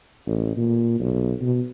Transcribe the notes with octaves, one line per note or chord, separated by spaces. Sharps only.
A1
A#2
B1
B2